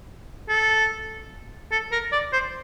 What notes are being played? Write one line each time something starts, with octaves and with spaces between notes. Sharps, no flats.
A4
A4
A#4
D5
C5